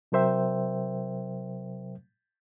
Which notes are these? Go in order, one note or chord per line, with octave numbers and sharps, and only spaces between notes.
C3 F#3 A#4 C5 E5 G5